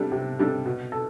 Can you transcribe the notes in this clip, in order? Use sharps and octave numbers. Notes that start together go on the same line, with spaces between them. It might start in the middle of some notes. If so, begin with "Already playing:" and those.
Already playing: C3 G3 D4 A4
C3
G3 D4 A4
B2
A4